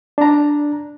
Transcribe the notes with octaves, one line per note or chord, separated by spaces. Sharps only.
D4 A#5